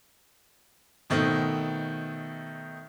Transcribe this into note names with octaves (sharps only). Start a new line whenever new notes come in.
B2 D#3 A3 C4